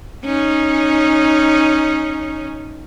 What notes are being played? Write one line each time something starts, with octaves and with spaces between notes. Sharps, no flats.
C#4 D#4